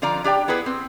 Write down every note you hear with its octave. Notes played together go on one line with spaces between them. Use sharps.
D3 F3 F4 D5 A#5
D4 G4 D5 G5
B3 E4 G#4 B4
C4